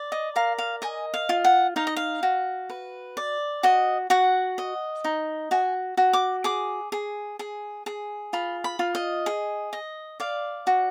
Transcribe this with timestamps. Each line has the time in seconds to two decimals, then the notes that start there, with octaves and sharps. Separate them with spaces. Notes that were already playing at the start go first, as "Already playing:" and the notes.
Already playing: D5
0.12 D#5
0.36 A#4 F5
0.58 F5
0.82 D#5 G#5
1.14 F5
1.29 F4
1.44 F#5
1.76 D#4 F5
1.87 D#5
1.96 F5
2.23 F#4
2.70 B4
3.17 D5
3.63 F#4 D#5
4.10 F#4 F#5
4.58 D#5
5.04 D#4
5.51 F#4 G#5
5.97 F#4
6.13 D6
6.44 G#4 D6
6.92 G#4
7.39 G#4
7.86 G#4
8.33 F4 B5
8.64 B5
8.79 F4
8.95 D#5
9.26 G#4
9.73 D#5
10.20 D5 F5
10.67 F#4